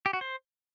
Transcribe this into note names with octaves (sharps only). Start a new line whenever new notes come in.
G4
F#4
C5